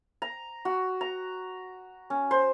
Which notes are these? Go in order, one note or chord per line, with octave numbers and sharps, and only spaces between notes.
A#5
F#4
A#5
C#4
C5